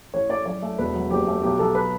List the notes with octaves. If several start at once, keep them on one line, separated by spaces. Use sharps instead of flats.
A1 C#5
A3 D5
F#2 D5
A3
E1 B4
F#3
F#1 G4
A3
B1 G4
B1 A4
B4